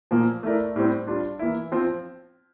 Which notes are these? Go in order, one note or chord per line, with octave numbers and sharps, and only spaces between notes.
A#2 F3 A#3
A3 E4 A#4 D5
A2 G3 C4
G3 D4 F4
E3 A#3 E4
F3 C4 F4